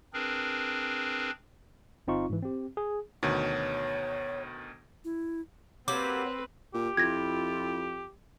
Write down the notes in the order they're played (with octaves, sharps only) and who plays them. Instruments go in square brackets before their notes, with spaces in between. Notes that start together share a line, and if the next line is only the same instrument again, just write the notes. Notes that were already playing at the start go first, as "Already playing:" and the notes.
[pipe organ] C4 D4 G#4 A#4 B4
[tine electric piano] G1 C4 D#4 F4 C#6
G#2 E3
C4 G4
G#4
[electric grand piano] D2 B2 D#3 [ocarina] C#5
[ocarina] E4
[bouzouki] F#3 G3 A#3 [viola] C4 B4 [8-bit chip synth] D6
[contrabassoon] A#2 [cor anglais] G4
[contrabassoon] F2 [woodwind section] E4 F4 [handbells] G#6 A#6